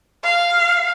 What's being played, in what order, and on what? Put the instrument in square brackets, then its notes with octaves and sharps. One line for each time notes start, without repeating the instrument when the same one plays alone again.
[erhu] F5